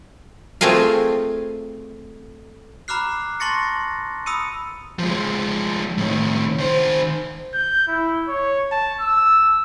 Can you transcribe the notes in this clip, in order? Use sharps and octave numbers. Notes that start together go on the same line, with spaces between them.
A3 C4 F4 G#4 A#4 F5
A#5 B5 D6 F6 F#6 C7
A5 C6 C#6 A6 A#6 C#7
B5 D#6 E6 C#7 D#7
F3 G#3
A2 D#3
D#3 C5
G6
E4
C#5
A5
E6